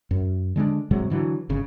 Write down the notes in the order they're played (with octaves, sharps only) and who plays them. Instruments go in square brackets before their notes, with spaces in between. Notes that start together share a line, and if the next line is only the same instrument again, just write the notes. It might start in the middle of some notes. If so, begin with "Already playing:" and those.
[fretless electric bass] F#2
D3 G#3 C4 D4
G#2 C3 F#3 G#3
D3 E3 F#3
G1 C#3